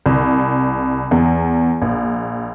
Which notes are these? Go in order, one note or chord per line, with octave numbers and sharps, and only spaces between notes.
C2
E2
A#1